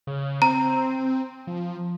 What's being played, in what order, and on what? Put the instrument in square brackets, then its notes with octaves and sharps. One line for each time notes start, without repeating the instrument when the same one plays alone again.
[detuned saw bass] C#3
[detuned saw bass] C4 [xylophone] A#5
[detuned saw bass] F3